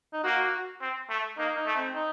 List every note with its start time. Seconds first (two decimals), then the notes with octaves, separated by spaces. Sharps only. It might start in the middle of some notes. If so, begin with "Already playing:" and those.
0.13 D#4
0.24 A#3 F#4
0.44 F#4
0.81 C4
1.09 A3
1.38 A#3 D#4
1.57 D#4
1.66 A3
1.76 C4
1.94 D#4